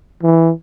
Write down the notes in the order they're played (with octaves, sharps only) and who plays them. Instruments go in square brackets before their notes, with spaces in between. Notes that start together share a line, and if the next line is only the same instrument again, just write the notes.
[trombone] E3